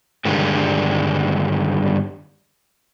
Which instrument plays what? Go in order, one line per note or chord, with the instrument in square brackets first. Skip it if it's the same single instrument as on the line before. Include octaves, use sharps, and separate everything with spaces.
[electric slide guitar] G2 D3 D#3 G3 G#3